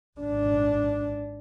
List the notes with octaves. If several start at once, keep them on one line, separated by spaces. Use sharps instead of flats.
G#1 D4